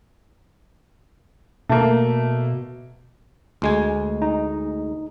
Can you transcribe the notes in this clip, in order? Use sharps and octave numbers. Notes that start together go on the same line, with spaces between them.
B2 A3 A#3
D2 G#3 G#5
D#4